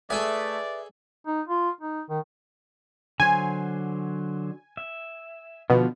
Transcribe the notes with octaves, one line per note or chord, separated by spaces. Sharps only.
A3 G#4 A4 B4 D5 E5 G#5 D#6
D#4
F4
D#4
D#3
D3 F#3 C5 G#5
E5
B2 D3 F3 F4